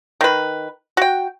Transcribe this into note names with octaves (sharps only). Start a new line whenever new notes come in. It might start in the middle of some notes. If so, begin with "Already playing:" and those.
D#3 B4
F#4 G5